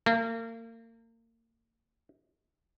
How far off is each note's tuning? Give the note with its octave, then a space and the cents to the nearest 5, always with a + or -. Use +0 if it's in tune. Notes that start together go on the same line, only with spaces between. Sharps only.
A#3 -35